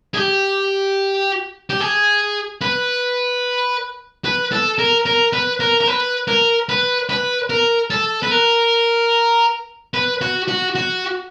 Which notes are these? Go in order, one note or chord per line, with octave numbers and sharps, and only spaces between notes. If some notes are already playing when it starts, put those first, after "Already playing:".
G#4
G4
G4
G#4
B4
B4
A4
A#4
A#4
B4
A#4
A#4
B4
A#4
B4
B4
A#4
A4
B4
A#4
B4
F#4
F#4
F#4